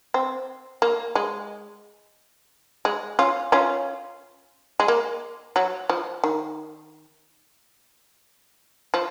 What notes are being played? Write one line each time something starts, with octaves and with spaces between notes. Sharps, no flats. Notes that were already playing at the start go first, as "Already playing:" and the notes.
C4
A#3
G#3
G#3
C#4 F4
C#4 F4
G#3
A#3
F#3
F3
D#3
F3